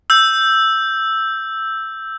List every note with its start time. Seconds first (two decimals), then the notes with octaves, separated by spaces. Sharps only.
0.10 E6 G6